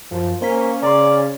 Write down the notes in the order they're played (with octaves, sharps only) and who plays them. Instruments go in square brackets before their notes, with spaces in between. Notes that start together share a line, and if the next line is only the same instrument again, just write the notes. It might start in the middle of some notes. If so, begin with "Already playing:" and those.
[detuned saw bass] F#2 [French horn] F3
[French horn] A#3 [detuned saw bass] C#4 [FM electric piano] C5 B6
[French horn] C#3 [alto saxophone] D5 [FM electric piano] A#5 C6